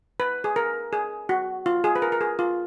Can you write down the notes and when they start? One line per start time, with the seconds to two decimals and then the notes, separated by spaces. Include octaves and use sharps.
0.20 B4
0.44 G#4
0.56 A#4
0.93 G#4
1.29 F#4
1.66 F4
1.84 G#4
1.96 B4
2.02 A#4
2.12 A#4
2.21 G#4
2.39 F4